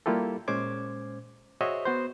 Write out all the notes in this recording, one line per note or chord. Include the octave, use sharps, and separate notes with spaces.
G3 A#3 E4 F4 G4 A4
A#2 G#3 C#4 C5 D6 G#6
F#4 G#4 C5 C#5 D#5 E5
B3 F#4 C5